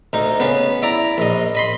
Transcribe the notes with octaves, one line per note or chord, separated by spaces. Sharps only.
D2 D#4
C#3 B3
E4 D5 A#5
A#1 D#5
D#5 B5 C6